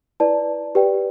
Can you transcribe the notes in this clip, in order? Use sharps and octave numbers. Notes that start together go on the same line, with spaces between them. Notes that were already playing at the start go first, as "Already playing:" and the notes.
E4 B4 D5 A5
G4 B4 D5 G5